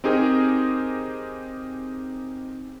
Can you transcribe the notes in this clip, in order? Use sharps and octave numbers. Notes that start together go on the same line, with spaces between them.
C4 D#4 G4 G#4 A#4